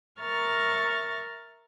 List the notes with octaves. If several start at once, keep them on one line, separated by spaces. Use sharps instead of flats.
A#4 E5 C#6 F6 A6